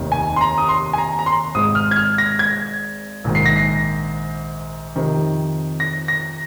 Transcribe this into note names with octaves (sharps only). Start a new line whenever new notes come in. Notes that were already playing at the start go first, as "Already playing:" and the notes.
Already playing: F1 D#2 D#3
G#5
C6
A#5
D#6
C6
G#5
A#5
A#5
C6
G#1 G#2 G#3 D#6
F6
G#6
F6
A#6
G#6
A#1 G#2 D#3
C7
A#6
C7
F2 C3 D#3
A#6
A#6